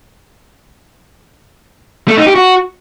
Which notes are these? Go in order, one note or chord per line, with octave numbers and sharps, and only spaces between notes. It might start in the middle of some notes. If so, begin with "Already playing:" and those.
A3
D#4
G4
F#4